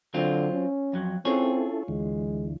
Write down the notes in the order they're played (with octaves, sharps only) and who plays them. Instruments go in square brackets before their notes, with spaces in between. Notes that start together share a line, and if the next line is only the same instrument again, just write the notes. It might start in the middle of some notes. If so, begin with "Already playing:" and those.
[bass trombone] D3 [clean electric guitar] F#3 C4 F4
[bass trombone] C#4
[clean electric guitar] F2 F#3
[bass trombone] C4 [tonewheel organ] C#4 E4 A4 [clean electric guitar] F4 G#4 C#5
[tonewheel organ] D2 D3 E3 [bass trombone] G#3